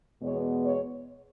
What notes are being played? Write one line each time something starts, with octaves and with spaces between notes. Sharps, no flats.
E2 B2 G#3 B3 C#5
C#5